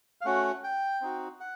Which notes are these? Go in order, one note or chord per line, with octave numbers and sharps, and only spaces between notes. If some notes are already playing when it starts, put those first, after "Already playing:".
F5
A3 C#4 F#4 F#5
G5
C4 D#4 F#4
F#5